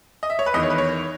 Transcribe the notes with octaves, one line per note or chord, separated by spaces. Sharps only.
D#5
E5
C#5
B4
E2 D#3 D#5
C#5
B4
C#5